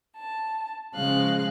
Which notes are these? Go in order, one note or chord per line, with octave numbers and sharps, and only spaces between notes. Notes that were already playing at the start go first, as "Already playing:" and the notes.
A5
C#3 F3 G#3 F5 F#6